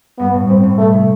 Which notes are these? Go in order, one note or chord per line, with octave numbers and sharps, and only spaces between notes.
G2 B3
A2
G2 C4
A2
B2 A3
C3